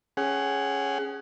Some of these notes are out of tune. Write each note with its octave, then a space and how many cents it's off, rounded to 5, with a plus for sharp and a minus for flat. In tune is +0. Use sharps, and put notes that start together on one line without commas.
C#4 +0 G#4 +0 F#5 +25